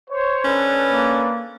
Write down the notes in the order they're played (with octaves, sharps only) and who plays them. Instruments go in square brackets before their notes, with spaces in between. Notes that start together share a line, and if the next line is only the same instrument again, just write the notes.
[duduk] C5 [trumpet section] C#5
[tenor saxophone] C#4 [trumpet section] D4 A4 B4
[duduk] A#3